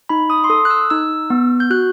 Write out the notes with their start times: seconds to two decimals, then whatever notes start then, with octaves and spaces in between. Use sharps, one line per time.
0.09 D#4 B5
0.30 D#6
0.44 C6
0.50 A4 D#6
0.65 F#6
0.70 E6
0.90 D#4 E6
1.30 B3
1.60 G6
1.70 F#4 F#6